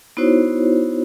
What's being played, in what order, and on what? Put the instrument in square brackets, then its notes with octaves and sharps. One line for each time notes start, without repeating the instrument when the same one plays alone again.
[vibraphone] B3 D#4 E4 F#4 C5 C#5